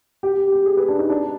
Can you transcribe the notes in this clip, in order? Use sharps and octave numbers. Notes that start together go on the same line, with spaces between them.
G4
G4
G4
G#4
B4
D4
D#4
D4